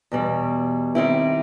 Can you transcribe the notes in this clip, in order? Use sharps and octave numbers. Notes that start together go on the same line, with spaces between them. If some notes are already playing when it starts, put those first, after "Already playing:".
E2 B2 G3
D#3 G3 C4 E4